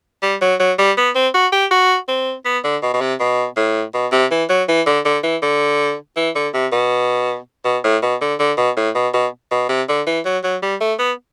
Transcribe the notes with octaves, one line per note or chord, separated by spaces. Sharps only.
G3
F#3
F#3
G3
B3
C4
F#4
G4
F#4
C4
B3
D3
B2
B2
C3
B2
A2
B2
C3
E3
F#3
E3
D3
D3
E3
D3
E3
D3
C3
B2
B2
A2
B2
D3
D3
B2
A2
B2
B2
B2
C3
D3
E3
F#3
F#3
G3
A3
B3